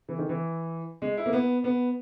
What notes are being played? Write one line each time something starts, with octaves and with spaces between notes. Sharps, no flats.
E3
D#3
E3
G#3
E4
A#3
B3
B3